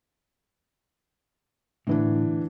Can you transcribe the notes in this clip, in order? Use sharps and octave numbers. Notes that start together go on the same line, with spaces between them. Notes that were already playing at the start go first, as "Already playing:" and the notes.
A2 D3 E3 D4